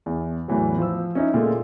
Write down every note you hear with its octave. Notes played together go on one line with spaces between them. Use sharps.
E2
E2 A2 E3 F#3
F3 C5 E6
C#4 D#4 E4
A#2 G#3 A3